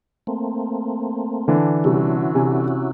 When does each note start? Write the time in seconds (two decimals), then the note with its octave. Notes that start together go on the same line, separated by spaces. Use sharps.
0.27 A3 A#3 C4
1.48 D3 E3 D4
1.84 C3 G3 C#4 E4 F#4
2.35 C3 G#5